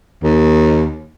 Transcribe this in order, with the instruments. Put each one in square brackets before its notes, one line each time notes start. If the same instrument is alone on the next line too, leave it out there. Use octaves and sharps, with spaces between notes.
[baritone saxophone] D#2